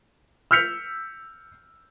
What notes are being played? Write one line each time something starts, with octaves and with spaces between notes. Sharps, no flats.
E6 F6 G6 B6 C#7 F7